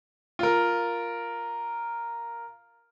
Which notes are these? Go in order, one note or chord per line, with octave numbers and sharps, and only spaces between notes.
F4 A#4